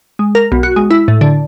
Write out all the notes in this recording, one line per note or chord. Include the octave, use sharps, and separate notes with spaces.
G#3
A#4
B1
F#4
G#3
E4
A2
D3